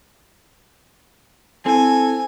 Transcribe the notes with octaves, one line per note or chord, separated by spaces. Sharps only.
C4 E4 A4 C5 G#5